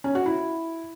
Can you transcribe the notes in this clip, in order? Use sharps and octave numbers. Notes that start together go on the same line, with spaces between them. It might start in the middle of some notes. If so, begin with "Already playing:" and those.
C#4
F#4
E4